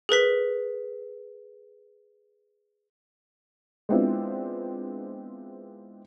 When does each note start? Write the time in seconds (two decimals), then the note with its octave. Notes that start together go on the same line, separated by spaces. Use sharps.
0.09 G#4 A#4 B4 B6
3.89 G#3 B3 C4 D4 E4 F4